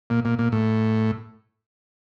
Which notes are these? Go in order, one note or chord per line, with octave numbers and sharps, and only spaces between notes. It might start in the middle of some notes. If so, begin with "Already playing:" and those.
A#2
A#2
A#2
A2